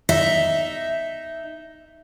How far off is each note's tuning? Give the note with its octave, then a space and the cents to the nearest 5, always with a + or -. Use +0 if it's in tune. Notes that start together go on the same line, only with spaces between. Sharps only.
D#4 +0 E5 +0